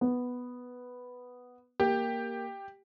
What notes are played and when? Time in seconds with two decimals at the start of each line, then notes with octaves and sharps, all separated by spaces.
0.01 B3
1.80 A#3 G4